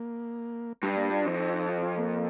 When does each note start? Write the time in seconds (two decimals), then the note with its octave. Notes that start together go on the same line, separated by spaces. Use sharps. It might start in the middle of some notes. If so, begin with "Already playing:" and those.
Already playing: A#3
0.83 G2 G3
0.97 A#3
1.11 F4
1.25 F2 D#4
1.39 D#4
1.49 F4
1.54 D#4
1.69 F4
1.82 F4
1.98 A#3